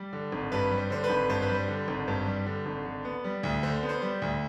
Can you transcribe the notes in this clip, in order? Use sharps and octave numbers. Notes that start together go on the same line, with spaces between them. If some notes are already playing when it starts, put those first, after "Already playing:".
Already playing: G3 D5
D3
G#1
G2 B4
G3
C5
D3 C5
B4
G#1
G2 C5
B4
G3
C5
D3
G#1
G2 C5
G3
D3
G#1
D3
B3
G3
D2
D3 C5
B3
C5
G3
D2